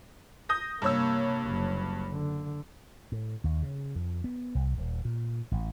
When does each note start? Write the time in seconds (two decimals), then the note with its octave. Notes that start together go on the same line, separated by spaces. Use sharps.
0.49 D#6 G6 A#6
0.82 G2 C3 A#3 C#5 E6
1.47 F#1
2.11 D3
3.12 A2
3.44 D#2
3.63 C#3
3.95 F2
4.24 B3
4.55 C2
4.78 D#1
5.05 A#2
5.52 A1